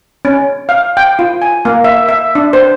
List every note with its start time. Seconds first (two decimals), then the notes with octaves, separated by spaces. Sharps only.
0.25 C#4
0.69 F5
0.97 G5
1.19 F4
1.42 G#5
1.65 A#3
1.84 E5
2.09 E5
2.35 D4
2.53 C5